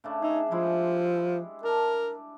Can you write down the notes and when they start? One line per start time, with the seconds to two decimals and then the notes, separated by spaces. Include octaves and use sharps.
0.04 C#3 A3 D4
0.22 D#4 G#4 E5
0.51 F3 G3 G#3 E4
1.63 D4 A#4